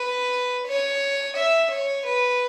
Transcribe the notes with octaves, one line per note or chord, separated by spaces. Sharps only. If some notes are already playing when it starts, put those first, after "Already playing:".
Already playing: B4
C#5
E5
C#5
B4